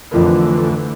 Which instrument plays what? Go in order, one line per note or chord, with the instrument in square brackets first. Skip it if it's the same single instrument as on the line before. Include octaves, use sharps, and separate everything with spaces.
[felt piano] F2 F3 A#4 [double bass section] D3 E3 A3